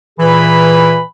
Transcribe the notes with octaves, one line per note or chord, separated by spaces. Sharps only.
A#2 E3 G#4 B4 B5